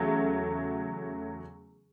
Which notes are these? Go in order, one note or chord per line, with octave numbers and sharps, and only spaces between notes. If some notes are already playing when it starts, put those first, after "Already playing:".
Already playing: E2 C#3 F#3 A3